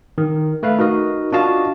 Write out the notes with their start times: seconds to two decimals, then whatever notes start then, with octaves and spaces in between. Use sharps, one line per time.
0.18 D#3
0.63 A3 B4 F5
0.78 D#4 F#4 A#4 D#5
1.32 D4 F4 F#4 D#5 F5 A5